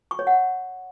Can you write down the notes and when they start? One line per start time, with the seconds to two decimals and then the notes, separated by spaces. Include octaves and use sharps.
0.11 C#6
0.19 C#5
0.27 F#5